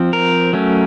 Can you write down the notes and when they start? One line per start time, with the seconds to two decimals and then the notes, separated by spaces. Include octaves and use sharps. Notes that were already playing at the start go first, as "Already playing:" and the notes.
Already playing: F3 C4
0.13 A#4
0.53 F#3 A3 C#4